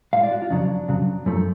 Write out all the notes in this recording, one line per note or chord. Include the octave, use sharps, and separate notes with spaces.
A2 G#3 F5
D5
F#4
F4
F2 C#3 F#3 D4
F2 C#3 F#3
F#2 F3 A3